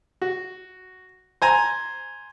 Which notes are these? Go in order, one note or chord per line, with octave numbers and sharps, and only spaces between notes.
F#4
C5 G#5 A#5